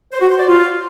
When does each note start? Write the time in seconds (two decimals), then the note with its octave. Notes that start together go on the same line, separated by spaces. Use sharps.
0.12 C5
0.21 F#4
0.30 C5
0.39 D5
0.48 F4